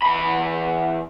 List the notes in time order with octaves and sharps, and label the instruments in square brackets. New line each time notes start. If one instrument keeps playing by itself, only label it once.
[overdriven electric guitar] E2 B5